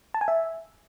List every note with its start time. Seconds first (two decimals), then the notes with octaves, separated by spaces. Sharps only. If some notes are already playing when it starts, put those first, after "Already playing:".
0.14 A5
0.21 G#5
0.28 E5